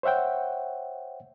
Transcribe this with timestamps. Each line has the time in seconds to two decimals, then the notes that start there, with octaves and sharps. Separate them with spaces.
0.03 C5 C#5 E5 F#5 G5